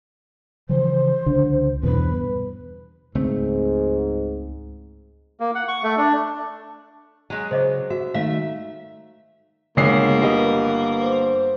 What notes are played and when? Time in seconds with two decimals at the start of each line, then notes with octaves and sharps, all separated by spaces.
0.69 C#3 E3 F3 C5
1.26 C#2 D3
1.83 E2 G2 B2 B4
3.15 C#2 G#2 A3 C4
5.40 A#3
5.55 F#5
5.68 C#6
5.83 A3
5.97 D4
7.30 F#3 G#3 G#5
7.51 C#3 C5 D#5 D6
7.90 F#4 E5
8.14 D#3 A3 E5 F5
9.77 G1 C#3 G#3 A#3 C7
10.22 G4 A#4 B4 D#5
11.03 C5